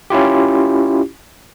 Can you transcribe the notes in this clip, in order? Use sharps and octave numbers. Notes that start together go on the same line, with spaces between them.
C#4 E4 F4 G4